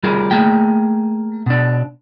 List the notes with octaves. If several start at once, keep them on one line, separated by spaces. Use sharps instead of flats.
G3 F4 G#4 A#4
A3 A#3 G#4 G5
B2 D4